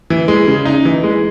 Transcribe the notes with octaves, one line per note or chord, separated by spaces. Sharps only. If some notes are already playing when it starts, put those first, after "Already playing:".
E3
G#3
C#3
D#4
E3
G#3